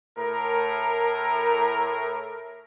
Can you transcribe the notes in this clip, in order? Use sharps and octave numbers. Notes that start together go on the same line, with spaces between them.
A2 A#4